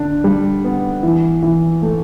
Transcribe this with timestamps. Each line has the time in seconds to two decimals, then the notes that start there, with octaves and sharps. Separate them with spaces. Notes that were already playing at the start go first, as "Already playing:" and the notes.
Already playing: D3 D4
0.24 G3
0.64 B3
1.03 E3
1.43 E3
1.82 A3